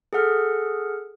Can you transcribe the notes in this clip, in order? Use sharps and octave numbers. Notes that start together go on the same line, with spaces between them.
G#4 A4 F#5 F6